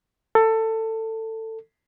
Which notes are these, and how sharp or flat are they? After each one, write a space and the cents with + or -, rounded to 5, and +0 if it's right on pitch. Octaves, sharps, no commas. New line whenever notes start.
A4 +20